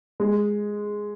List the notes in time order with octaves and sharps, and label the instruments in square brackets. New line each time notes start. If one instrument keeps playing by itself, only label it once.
[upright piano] G#3